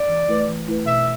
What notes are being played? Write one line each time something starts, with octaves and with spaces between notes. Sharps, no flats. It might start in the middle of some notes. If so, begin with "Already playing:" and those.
Already playing: D5
E3
A3 E4 B4
E3
A3 E4 B4
B2 E5